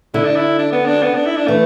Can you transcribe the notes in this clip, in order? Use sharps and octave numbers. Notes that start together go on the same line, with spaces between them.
D3 E4
D4
E4
D4
B3
D4
B3
D4
E4
D4
E3 A3